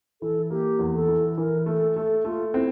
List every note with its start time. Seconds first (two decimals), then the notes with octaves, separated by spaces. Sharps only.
0.22 E3 A4
0.50 A#3 G4
0.79 E2
0.94 A4
1.08 E3
1.38 E3 A#4
1.66 A3 A4
1.96 A3 A4
2.25 A3 F4
2.53 C4 E4